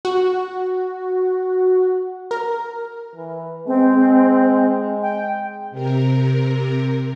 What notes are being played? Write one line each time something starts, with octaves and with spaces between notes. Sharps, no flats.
F#4
A#4
E3
G#3 C4
G5
C3 A#4